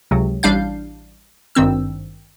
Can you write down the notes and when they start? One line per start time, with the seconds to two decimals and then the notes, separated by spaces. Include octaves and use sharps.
0.11 C#2 C3 F#3
0.43 A1 G3 D4 F5 G6
1.55 G#1 G2 D#3 C4 E6